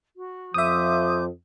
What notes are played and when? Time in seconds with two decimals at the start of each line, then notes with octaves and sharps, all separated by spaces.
0.16 F#4
0.54 F2 F3 E5 C6 D6 D#6 G6